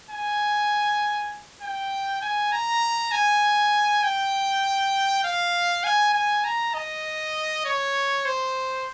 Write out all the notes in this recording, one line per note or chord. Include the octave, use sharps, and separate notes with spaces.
G#5
G5
G#5
A#5
G#5
G5
F5
G#5
G#5
A#5
D#5
C#5
C5